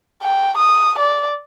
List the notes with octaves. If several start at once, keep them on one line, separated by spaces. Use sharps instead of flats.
G5
D#6
D5